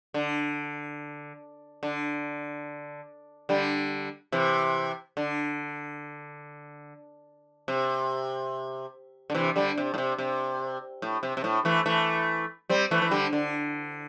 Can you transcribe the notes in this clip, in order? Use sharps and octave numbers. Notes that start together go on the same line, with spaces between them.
D3
D3
D3 G3
C3 E3
D3
C3
D3
C3 E3
D3 G3
C3
A2
C3
C3
A2
C3
C3
A2
E3 A3
E3 A3
G3 C4
E3 A3
E3
D3 G3
D3